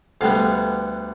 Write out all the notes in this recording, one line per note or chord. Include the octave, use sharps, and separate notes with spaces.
D2 D3 G3 B3 F5